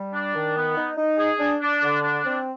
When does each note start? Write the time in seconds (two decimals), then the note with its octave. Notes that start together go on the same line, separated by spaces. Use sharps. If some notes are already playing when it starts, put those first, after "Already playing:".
Already playing: G3
0.13 D4
0.35 D#3
0.56 B3
0.77 D#4
0.97 D#4
1.18 G#4
1.39 D4
1.61 D4
1.82 D3
2.02 D4
2.24 C4